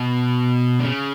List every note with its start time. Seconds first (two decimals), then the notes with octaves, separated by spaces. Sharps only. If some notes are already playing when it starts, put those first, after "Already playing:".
Already playing: B2
0.79 D3
0.85 C#3